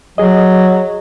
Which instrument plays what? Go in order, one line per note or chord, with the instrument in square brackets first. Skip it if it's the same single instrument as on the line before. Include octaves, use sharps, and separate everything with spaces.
[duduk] F#3 [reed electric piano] G#4 D#5